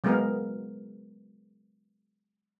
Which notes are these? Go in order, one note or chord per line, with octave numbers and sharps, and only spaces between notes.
F#3 G#3 A#3 B3 A#4